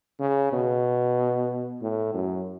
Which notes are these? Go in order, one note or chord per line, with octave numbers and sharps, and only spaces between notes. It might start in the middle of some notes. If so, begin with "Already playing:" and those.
C#3
B2
A2
F#2